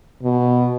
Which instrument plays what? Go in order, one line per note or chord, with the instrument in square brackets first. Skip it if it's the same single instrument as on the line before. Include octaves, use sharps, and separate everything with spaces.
[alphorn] B2